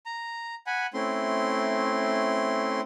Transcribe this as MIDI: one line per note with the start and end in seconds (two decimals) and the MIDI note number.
0.06 0.55 82
0.66 0.86 78
0.66 0.86 80
0.66 0.86 83
0.94 2.81 57
0.94 2.81 60
0.94 2.81 61
0.94 2.81 64
0.94 2.81 84